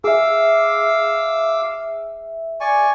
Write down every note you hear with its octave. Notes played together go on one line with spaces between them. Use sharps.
G#4 E5 F5 D6 E6
D5 G#5 C#6